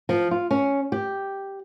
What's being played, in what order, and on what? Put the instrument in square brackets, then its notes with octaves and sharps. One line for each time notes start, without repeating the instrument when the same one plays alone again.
[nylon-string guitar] F3
F4
C#4
G4